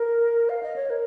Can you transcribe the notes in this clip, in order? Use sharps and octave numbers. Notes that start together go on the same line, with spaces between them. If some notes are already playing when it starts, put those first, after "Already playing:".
Already playing: A#4
F5
D#5
C#5
A#4